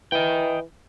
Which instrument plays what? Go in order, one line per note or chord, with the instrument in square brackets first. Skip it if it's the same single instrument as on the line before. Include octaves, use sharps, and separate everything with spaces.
[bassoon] E3 [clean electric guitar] D#5 G5